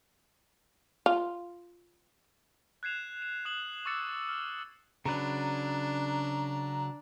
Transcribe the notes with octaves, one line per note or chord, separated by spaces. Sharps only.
F4
F#6 G#6 C7 E7 F7
E7
D#6 F#6 E7 F#7
C#6 D6 E6 A6 C#7
F6
C#3 F#3 D4 B4 A#5